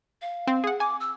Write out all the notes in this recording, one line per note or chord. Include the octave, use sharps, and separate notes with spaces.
F5
C4
G#4 F#5
G#5 D6
E6